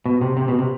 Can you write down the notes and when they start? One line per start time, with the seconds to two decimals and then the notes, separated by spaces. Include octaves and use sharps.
0.06 B2
0.21 C3
0.37 C3
0.48 B2
0.59 C3